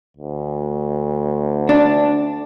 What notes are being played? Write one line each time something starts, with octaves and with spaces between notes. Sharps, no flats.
D2
D4